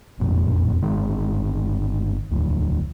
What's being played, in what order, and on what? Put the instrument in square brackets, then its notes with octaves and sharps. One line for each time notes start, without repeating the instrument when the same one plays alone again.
[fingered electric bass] E1 A1 F2 A#2
G1 D#3 G#3
E1 D2